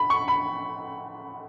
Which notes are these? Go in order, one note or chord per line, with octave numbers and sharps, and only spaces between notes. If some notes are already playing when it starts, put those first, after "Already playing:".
Already playing: B5
C#6
B5